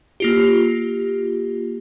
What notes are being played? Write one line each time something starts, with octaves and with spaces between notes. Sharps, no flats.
A#3 F4 G4